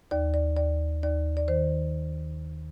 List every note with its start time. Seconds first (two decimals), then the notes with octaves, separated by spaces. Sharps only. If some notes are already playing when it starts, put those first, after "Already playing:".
0.11 D#2 D5
0.34 D5
0.57 D#2 D5
1.03 D#2 D5
1.37 D5
1.48 D#3 C5